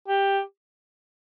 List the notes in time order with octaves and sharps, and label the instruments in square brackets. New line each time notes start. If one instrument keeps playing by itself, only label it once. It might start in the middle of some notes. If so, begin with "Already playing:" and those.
[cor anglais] G4